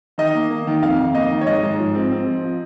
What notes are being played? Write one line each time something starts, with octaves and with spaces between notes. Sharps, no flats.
D#3 D#5
A#3
A#3
D#3
F2 F5
F2
A#3 D#5
D#3
C#5
G#2 D#5
G#2
F3
C4
C4
F3
F3